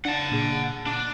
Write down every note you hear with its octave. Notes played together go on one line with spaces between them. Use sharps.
D4 F#5 A5
A#2 G#4
D4 D6